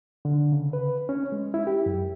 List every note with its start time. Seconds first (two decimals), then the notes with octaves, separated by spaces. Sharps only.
0.25 D3
0.52 C#3
0.73 B4
1.09 C#4
1.32 G#3
1.54 E4
1.67 G4
1.86 F#2